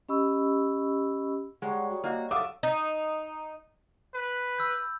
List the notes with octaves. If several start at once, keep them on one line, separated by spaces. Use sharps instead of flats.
C#4 G4 D#5 B5 C#6 E6
G3 G#3 D#4 C#5 F#5
F#4
A#3 F#4 D#5
F#3 F#4 A4 E5 F5 D6 D#6
D#4
B4
B5 E6 G6